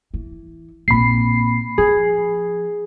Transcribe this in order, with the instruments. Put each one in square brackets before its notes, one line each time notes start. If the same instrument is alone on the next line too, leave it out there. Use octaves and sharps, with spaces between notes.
[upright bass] E3
[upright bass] A#1 C4 [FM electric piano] B5 C7
[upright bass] F3 [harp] G#4